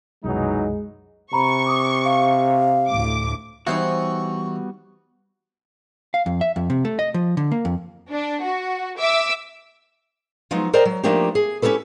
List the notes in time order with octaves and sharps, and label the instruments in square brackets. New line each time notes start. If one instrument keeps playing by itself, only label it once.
[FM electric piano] C2 F#2 B2 [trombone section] E3 F#3 D#4 [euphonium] G#3
[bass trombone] C3 [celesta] A#5 B5 [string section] C#6
[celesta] D6 D#6
[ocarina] F5
[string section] D2 A2 D6
[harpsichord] E3 [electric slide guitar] G3 B3 F#4 [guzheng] D#4 C5 C#5 [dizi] C#6
[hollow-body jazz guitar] F5
F2
E5
F2
C3
A3
D#5
F3
D3
A#3
F2
[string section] D4
F#4
E5 D6 E6
[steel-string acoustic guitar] F3 F#3 G#3 B3 D#4
A#4 C5 D5 D#5 G5 A#5
F#3
F3 A3 A#3 D4 D#4 G4
G#4
C#4 D#4 G4 A4 B4